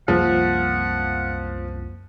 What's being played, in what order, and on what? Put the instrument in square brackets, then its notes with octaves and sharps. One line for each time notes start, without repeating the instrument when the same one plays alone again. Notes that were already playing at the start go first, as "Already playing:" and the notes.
[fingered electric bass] C2 F#2 A#3 [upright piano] F3 [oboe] F#5